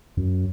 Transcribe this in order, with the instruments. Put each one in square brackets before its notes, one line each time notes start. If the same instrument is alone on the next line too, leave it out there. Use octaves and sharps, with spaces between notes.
[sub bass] F#2